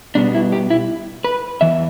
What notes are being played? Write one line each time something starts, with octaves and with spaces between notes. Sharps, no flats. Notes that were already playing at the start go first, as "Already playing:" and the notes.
B2 G3 B3 D4
E4
G4
E4
B4
E2 E3 E5